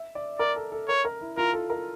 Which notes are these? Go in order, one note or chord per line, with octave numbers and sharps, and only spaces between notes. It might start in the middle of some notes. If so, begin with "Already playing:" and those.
Already playing: E5
D5
A#4 D5
A4
A4
A#4 C#5
A#4
E4
F4 A#4
A4
A#4